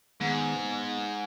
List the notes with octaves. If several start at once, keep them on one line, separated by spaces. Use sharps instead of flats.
G#2 D#3 G#3 B3
B3